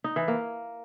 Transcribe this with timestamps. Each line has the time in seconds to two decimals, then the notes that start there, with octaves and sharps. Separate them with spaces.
0.04 D#4
0.16 E3
0.28 A#3